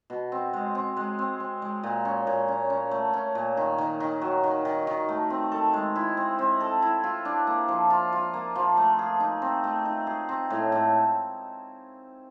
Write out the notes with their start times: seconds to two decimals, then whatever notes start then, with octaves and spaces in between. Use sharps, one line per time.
0.10 B2
0.32 C4
0.53 G#3
0.75 C4
0.96 G#3
1.19 C4
1.40 C4
1.62 G#3
1.83 A#2
2.05 C#4
2.27 A#2
2.48 C#4
2.70 C#4
2.91 A3
3.14 C#4
3.35 A#2
3.57 D#3
3.78 D#3
4.00 D#3
4.22 F#3
4.43 D#3
4.65 D#3
4.87 D#3
5.09 A3
5.30 C4
5.52 A4
5.73 G#3
5.96 E4
6.17 C4
6.39 C4
6.60 A4
6.82 E4
7.04 F4
7.25 D4
7.47 A#3
7.68 F3
7.90 F4
8.13 F4
8.34 A#3
8.55 F3
8.77 A3
8.99 G#4
9.20 D#4
9.42 C4
9.64 A3
9.85 D#4
10.07 G#4
10.29 C4
10.50 A2
10.72 A2